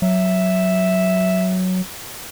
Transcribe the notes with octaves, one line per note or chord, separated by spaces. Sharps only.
F#3 E5